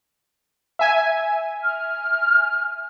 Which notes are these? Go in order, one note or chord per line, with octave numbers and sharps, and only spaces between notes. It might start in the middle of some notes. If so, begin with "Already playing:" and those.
E5 G#5
F6